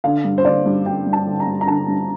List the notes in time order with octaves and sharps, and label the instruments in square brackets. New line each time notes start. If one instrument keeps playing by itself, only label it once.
[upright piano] D3 F5
G2
C5
D3 D5
G2
D3 G5
G2
A5
D3
A#5
G2
A#5
D3 A5
G2